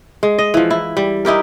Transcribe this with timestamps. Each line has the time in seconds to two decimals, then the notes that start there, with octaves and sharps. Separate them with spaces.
0.23 G#3
0.38 D#5
0.54 E3 F3
0.70 E4
0.97 G3
1.25 D#4 E4 G4 A#4